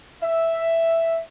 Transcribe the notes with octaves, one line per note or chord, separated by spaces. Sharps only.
E5